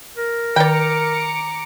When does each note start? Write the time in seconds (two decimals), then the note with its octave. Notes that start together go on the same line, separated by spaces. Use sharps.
0.17 A#4
0.56 D#3 D5 G5 A#5 D6 C#7